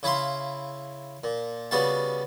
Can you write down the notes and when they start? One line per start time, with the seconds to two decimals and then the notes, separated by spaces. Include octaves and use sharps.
0.03 C#3 E4 E5 F5 C6
1.24 A#2
1.71 C#3 G3 B3 F#4 F5 A5